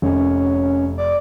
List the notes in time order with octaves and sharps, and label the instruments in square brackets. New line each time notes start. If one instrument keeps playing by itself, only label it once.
[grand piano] F1 [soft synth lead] C#4
[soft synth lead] D5